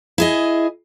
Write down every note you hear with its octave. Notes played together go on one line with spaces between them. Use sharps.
E4 G#4 D#5